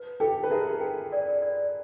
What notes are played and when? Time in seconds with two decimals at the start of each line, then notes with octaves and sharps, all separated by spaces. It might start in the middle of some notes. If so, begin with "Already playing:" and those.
Already playing: B4
0.20 G4 A4 G5
0.43 B4
0.51 G#4 A#4 E5
0.81 G5
1.12 D5
1.42 D5